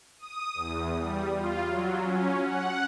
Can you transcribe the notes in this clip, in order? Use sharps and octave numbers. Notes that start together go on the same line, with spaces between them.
D#6
E2
G3
F4
F#3
C#4
F#5